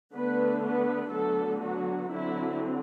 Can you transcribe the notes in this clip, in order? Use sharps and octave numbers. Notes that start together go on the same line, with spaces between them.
D3 A3 B3 D4 B4
B3 B4
D3 F#3 A3 B3 A4
F#3 F#4
D3 F#3 C4 E4